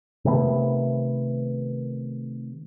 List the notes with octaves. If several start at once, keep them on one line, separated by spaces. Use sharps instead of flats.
C3 D#3 A3 B3